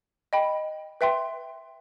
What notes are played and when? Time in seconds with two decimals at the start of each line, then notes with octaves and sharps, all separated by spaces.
0.33 D#5 G5 B5
1.01 B4 E5 G5 C6